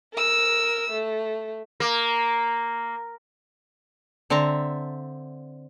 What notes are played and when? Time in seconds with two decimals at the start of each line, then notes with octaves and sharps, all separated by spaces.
0.14 A#4 E6
0.91 A3
1.80 A#3
4.30 D3 C4 E5 A5 A#5